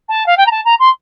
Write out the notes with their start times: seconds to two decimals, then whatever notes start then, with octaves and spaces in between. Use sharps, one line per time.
0.08 A5
0.26 F5
0.37 G5
0.46 A#5
0.51 A5
0.65 A#5
0.79 C6